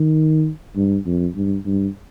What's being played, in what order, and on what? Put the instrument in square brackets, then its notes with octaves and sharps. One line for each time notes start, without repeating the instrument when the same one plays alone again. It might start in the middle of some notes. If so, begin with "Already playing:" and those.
Already playing: [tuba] D#3
G2
F2
G2
G2